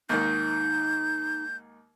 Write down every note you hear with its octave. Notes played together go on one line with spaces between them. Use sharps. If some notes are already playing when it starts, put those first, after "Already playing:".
D#2 G#2 D#3 D#4 G6